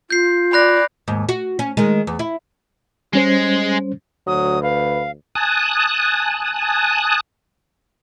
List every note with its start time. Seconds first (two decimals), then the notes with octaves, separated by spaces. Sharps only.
0.10 F4 G6 C7
0.53 D5 B5 F#6 A#6
1.08 D#2 G#2
1.29 F#4
1.59 C#4
1.77 D#3 G#3
2.07 E2
2.19 E4
3.13 G3 G#3 C#4 C5
4.27 D2 F#3 D#6
4.63 B4 F5
5.35 G#5 A5 D#6 F#6